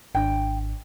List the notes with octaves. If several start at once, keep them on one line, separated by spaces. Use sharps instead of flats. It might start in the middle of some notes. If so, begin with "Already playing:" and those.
G#1 D4 G5